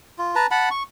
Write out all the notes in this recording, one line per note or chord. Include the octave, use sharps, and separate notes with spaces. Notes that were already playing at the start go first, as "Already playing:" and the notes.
F4
B4 A5 A#5
F#5 A5 B5
C#6